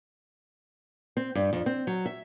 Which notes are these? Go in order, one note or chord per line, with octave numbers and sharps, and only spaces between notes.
C4
G2
F2
C4
F#3
E5